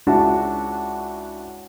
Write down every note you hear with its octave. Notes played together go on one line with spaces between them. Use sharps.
C#2 D4 E4 F#4 A5